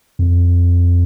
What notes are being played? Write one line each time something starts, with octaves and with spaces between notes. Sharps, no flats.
F2